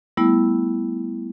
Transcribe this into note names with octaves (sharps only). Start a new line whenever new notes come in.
G3 A3 B3 E4